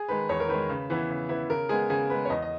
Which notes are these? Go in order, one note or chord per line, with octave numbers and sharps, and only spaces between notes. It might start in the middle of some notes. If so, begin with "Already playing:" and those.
Already playing: G#4
D#3 G#3 B4
E2 C#5
A#4
D#3 G#3 B4
C#3
E3 B3 E4
C#3
E3 B3 E4
C#3 A#4
G#3 B3 G#4
C#3 G#4
G#3 B3 B4
C#5
E2 D#5
D#5